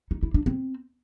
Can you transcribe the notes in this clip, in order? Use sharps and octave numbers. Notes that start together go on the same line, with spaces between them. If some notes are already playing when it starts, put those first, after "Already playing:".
D#4
E4
D4
C4